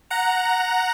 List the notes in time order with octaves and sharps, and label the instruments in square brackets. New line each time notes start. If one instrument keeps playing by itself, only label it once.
[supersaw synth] F#5 A#5